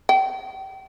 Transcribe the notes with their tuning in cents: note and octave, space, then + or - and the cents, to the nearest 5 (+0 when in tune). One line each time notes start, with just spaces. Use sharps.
G5 -35